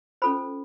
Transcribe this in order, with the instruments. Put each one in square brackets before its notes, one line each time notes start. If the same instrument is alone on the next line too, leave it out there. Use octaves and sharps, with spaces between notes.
[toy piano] C#4 F4 A4 C5 B5